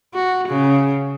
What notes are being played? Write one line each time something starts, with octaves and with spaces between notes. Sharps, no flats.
F#4
C#3